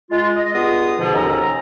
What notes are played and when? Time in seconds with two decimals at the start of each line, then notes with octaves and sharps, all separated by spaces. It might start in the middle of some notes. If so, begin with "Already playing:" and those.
0.11 G#3 F4
0.35 D#5
0.54 G2 B3 F4 G#4 D#6
1.00 G#2 B2 D3 F3
1.14 D#2 C#4 A4 A#5